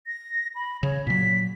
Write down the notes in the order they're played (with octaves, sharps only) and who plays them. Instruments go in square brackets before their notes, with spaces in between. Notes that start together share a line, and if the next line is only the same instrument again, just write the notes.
[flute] A#6
B5
[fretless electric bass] C#3 [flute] C#5
[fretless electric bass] A#2 F#3 [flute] B6